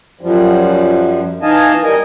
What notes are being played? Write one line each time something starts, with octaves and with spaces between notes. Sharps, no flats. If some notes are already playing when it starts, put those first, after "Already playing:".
F#2 F3 G3
E3 D#4 D#5 F5 G#5 A5
G3 A#4 D#5 G#5